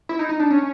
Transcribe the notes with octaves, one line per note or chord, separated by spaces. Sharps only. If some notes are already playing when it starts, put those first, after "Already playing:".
E4
D#4
D#4
D4
C#4